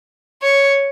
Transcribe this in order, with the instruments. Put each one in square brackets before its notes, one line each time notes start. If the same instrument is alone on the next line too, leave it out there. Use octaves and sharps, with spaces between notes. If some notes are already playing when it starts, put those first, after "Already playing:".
[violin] C#5